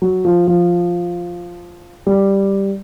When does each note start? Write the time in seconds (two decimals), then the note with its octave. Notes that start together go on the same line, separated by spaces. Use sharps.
0.02 F#3
0.25 F3
0.47 F3
2.07 G3